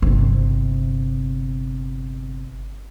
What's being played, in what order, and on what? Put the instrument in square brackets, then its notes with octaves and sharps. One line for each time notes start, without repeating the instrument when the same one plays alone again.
[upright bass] G1 C3